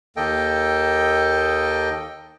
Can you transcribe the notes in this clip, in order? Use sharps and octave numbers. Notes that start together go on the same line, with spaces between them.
D#2 A#3 A4 D#5 G5